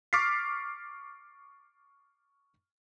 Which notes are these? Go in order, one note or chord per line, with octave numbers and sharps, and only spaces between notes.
C#6 D6 F6 A6 B6 C7